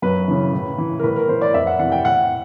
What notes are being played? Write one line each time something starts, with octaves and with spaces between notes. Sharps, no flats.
F#2 B4
C#3 E3
A2
E3
A#4
A2 B4
A#4
E3 C5
D5
F2 E5
F#5
C3 E3 F#5
G5
A2 F#5